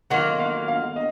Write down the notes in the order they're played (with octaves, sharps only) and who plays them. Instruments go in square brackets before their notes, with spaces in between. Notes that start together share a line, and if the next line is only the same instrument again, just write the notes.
[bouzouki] D#3 F#3 A#3 F4 [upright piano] F#5
[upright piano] F5
F5
D#5